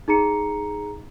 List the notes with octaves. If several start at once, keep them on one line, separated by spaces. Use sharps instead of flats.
D#4 G#4 A#5 C#7